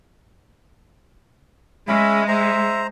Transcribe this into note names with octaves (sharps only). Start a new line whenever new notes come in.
G#3 C#4 E5 B5
C5 E5 A#5